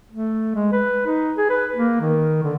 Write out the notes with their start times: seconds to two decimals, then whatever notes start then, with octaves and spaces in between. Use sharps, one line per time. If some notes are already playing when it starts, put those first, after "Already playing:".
0.11 A3
0.55 G#3
0.72 B4
1.06 D#4
1.37 G#4
1.50 B4
1.75 A#3
2.00 D#3
2.43 D3